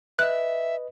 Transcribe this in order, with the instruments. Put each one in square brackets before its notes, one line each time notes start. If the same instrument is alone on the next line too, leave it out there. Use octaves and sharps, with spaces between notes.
[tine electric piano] B4 D#5 [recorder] E5 [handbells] F#6